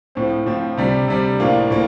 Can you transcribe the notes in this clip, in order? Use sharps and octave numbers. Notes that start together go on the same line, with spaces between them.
A2 F3 C4
A2 F3 C4
C3 G3 D4
C3 G3 D4
A2 F3 A#3 D4 F4
A2 F3 A#3